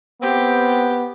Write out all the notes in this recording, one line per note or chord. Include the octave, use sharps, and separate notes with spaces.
B3 C4 G4